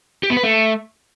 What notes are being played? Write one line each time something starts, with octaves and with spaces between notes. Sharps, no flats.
G4
B3
B4
A3